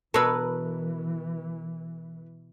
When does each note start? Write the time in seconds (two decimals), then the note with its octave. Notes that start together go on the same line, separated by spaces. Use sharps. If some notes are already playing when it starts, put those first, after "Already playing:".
0.14 B2 E3 A#4 B4 C#5 A5 E6